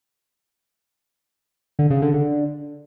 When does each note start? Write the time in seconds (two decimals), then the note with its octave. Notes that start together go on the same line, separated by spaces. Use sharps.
1.79 D3
1.90 C#3
2.02 D3
2.14 D3